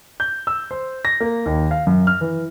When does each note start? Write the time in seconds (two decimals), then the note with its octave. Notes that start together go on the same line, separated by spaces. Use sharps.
0.20 G6
0.47 E6
0.71 C5
1.05 A#6
1.20 A#3
1.46 D#2
1.71 F5
1.87 F#2
2.07 F6
2.21 E3